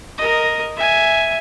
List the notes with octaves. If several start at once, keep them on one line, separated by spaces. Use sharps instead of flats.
A#4 D#5
E5 G#5